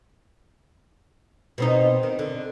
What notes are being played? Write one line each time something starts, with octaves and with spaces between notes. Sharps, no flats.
B2 C4 D#4
D#3
D3